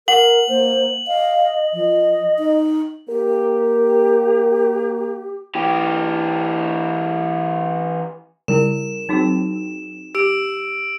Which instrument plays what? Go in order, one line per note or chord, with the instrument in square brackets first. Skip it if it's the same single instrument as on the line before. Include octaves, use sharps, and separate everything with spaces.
[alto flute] A#4 [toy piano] F#5 [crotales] F#7
[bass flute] A#3 [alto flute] C5
[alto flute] D#5 [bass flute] F5
[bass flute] F3 [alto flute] D#5
[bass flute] D#4
[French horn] A#3 [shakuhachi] G4 [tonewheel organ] A#4
[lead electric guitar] E3 G4
[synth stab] C#3 G3 [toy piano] E4 A#4 [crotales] E7
[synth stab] F#3 C4 [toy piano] D#4 F#4 G#4
[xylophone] G4 [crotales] E6 D7